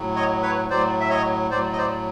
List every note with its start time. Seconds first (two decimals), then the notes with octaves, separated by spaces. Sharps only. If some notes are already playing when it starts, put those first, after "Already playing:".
Already playing: A2 F#3
0.15 C#5 D#5
0.43 B4 C#5
0.70 A2 F#3 C5 D5
1.00 E5
1.10 C#5 D#5
1.51 A2 F#3 C5 D5
1.73 D#5
1.78 C5 D5